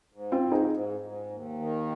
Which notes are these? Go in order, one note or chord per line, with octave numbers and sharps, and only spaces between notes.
G#2
C4 F4
G#2
D#4 G#4
G#2
G#2
D#2
D#3